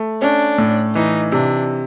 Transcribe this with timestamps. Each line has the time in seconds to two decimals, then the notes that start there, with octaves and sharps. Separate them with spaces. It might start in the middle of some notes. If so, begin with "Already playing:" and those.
Already playing: A3
0.22 C#4 D4
0.58 A2
0.95 E3 D#4
1.32 C3 D4